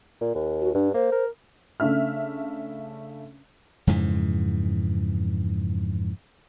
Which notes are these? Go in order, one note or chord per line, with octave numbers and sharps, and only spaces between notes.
A#2
D#2
F#4
G2 D4
A#3 C5
A#4
C#3 A3 D4 E5 F6
F2 G#2 C#3 E3